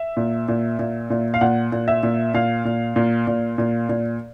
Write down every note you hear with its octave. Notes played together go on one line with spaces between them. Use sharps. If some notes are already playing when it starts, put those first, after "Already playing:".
Already playing: E5
A#2
A#2
A#2
A#2
F5
A#2 F#5
A#2
E5
A#2
A#2 F5
A#2
A#2
A#2
A#2
A#2